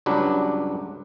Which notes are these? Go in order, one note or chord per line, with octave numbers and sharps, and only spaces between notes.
C#2 G2 F#3 D4 B4